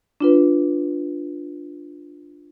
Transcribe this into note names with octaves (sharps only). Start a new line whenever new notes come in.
D4 F4 B4